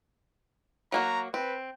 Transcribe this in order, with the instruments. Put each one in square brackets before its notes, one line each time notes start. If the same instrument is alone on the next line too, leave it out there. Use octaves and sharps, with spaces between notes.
[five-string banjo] F#3 A#3 F#4 [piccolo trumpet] A#5
[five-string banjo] C4 [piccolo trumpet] B4